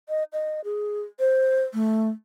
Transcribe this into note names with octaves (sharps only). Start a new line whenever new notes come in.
D#5
D#5
G#4
C5
A3